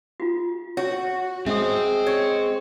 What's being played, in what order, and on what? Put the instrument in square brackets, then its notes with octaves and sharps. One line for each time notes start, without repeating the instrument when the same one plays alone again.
[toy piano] F4 F#4
[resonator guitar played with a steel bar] F#4 [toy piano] C#5
[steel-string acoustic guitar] G#3 [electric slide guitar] C4 C5 [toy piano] E5 D#6
[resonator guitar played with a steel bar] C#5